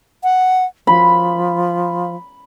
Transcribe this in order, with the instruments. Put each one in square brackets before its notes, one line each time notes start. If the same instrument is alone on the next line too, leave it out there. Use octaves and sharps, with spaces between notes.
[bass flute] F#5
[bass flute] F3 [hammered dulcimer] B5